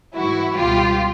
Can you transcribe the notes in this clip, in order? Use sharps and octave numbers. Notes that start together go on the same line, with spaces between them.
G#2 E3 G3 E4 F#4
C#2 B2 G3 F4 G4